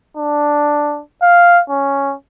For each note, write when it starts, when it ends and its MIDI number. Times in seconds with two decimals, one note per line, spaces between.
0.17 1.01 62
1.22 1.61 77
1.70 2.15 61